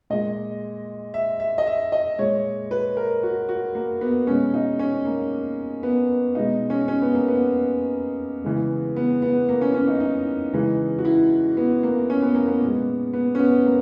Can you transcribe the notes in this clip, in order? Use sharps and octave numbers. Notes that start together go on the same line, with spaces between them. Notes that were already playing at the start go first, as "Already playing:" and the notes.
A#2 G#3 D#5
E5
E5
D#5
E5
D#5
A#2 G#3 C#5
B4
A#4
F#4
F#4
A#3
B3
B2 G#3 C#4
D#4
C#4
A#3
B3
B2 G#3 D#4
C#4
C#4
B3
A#3
B3
C#3 E3 G#3
B3
B3
A#3
C#4
C#4
D#4
D#4
C#3 E3 G#3
F#4
E4
B3
A#3
C#4
B3
A#3
B3
A#2
G#3
B3
C#4
B3
A#3